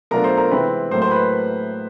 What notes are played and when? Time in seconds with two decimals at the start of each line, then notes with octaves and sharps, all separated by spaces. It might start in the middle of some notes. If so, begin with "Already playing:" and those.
0.11 B2 F#3 A3 D4 F4 A#4 A#5
0.24 C5 C6
0.37 A#4 A#5
0.51 C3 E3 G#3 C4 B4 B5
0.91 A2 F#3 A#3 C5 C6
1.02 C5 C6
1.11 B4 B5